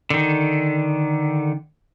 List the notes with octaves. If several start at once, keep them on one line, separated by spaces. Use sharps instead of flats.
D3 D#3